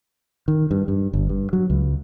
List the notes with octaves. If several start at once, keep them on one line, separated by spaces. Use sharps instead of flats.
D#3
G2
G2
G1
G2
F#3
C#2